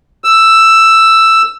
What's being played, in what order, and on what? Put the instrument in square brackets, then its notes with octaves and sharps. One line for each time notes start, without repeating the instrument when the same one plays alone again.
[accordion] E6